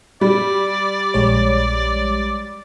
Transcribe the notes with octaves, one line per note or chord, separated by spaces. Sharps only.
G3 D5
A#1 G#3 C#5